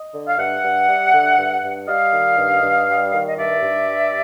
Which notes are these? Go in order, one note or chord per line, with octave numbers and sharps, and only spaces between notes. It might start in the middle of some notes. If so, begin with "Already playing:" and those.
Already playing: D#5
D3
F5
G2 E5 F#5
G2
G3
D3
G2
G2
G3 D#5 F5
D#3
G2
G2
G3
D#3
D#5
G2 D5 E5
G2
G3